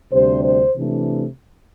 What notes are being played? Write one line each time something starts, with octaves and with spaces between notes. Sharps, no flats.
D2 C3 G3 D4 C5
C5
C3 E3 A3 D4